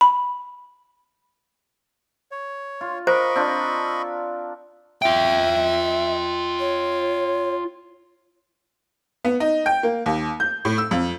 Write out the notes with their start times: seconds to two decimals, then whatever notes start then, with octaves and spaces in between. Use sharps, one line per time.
0.01 B5
2.32 C#5
2.81 F4
3.07 A#4 C5 D#5 B5 C#6
3.36 C4 D4 F4
5.02 F4 E5 G5
6.60 C#5
9.25 B3
9.40 D#4
9.66 G5
9.83 A#3
10.06 D#2
10.40 G6
10.65 A2
10.78 E6
10.91 F2